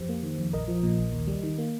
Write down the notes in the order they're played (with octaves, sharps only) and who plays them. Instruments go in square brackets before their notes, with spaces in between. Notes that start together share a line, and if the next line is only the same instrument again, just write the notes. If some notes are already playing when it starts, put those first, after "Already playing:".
Already playing: [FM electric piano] F2 G4 C5
A#3
D#3
F2
A#1 A#4 D#5
F3
A#2
A#1
D#2
G3
D#3
A#3